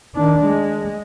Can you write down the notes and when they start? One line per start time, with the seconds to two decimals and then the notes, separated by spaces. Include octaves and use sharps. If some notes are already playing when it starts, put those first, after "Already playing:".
0.15 D#3 D4
0.45 G#3